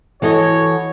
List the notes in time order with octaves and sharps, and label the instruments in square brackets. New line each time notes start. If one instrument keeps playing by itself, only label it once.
[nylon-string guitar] E3 A4 D#5 [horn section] F#4 C#5